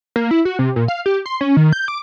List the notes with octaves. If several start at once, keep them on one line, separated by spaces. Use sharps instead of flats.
A#3
E4
F#4
C3
A#2
F5
G4
C6
C#4
D#3
G6
D6